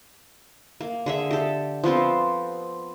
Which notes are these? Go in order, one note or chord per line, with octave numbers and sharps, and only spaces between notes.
A#3
D3 G#4 E5
G4 A4
F3 B3 C4 A4